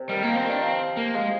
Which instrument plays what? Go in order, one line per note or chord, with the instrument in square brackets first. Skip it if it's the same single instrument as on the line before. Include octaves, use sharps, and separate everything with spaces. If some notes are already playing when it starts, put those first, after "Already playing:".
Already playing: [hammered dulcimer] C3
[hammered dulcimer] D#3 [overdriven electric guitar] G3
[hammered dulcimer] F3 [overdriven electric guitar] A#3
[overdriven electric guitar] C4
[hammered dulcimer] D#3
[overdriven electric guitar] D4
[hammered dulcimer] F3 [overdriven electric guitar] C4
[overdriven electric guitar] A#3
[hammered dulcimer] F3 [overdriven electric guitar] G#3